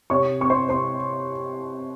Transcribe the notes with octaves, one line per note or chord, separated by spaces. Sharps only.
C3 C#5 C#6
C4 C#6
C5 C6
C3 C5 C6